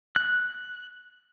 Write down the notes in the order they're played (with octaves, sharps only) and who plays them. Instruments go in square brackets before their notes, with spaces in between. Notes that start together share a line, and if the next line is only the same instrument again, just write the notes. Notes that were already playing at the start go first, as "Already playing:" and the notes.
[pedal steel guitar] F#6